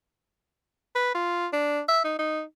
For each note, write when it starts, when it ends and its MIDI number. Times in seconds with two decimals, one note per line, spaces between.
0.95 1.13 71
1.15 1.47 65
1.53 1.80 62
1.88 2.01 76
2.04 2.15 63
2.19 2.42 63